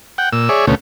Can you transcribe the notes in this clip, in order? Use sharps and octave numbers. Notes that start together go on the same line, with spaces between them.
F#5 G5
A#2 E6
G#4 C#5 D5 E5
D2 B2 A3 C#4